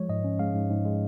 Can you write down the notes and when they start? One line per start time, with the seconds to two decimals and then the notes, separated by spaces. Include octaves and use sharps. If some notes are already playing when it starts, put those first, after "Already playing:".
Already playing: F3 G#3 C#5
0.09 G#2 D#5
0.24 C#4
0.39 G#3 F5
0.54 G#2
0.70 G#2
0.86 G#3